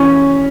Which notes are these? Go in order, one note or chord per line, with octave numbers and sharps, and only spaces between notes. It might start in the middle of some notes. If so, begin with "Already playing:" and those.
Already playing: E3 C#4